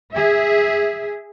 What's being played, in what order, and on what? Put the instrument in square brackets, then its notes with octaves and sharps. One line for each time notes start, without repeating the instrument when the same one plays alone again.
[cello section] G#4 E5